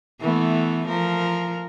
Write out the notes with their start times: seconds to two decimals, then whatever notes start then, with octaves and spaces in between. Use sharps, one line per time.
0.20 E3 A3 B3
0.88 F3 A#4